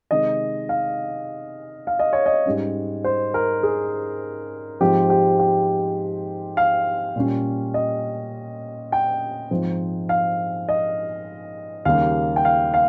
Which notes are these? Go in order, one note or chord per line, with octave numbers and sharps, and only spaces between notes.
C3 D#3 G#3 D#5
F5
F5
D#5
C#5
D#5
G#2 G3 C#4
C5
A#4
G#4
G#2 F3 C4 G4
G4
G4
F5
A#2 G3 C#4
D#5
G5
G#2 F3 C4 D#4
F5
D#5
D#2 C#3 G3 A#3 F5
G5
F5
F5